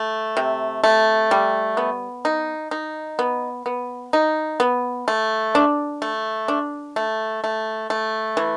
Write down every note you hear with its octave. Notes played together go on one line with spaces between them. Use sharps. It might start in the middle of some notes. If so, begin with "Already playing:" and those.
Already playing: A3
C3
A3
G3
B3
D#4
D#4
B3
B3
D#4
B3
A3
D4
A3
D4
A3
A3
A3
E3